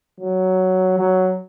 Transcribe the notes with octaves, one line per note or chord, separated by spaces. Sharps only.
F#3
F#3